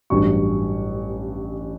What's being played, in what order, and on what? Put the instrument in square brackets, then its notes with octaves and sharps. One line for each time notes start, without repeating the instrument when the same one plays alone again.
[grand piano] A1 G2 F#3 C#6